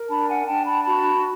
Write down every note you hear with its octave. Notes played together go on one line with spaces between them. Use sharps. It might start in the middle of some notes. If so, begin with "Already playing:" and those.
Already playing: A#4
D4 A5 B5
F#5 G#5
D4 G5 A5
A5 B5
F#4 A5 B5